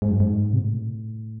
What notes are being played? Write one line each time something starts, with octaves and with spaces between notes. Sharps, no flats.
G#2
F#2
G#2
C3
A2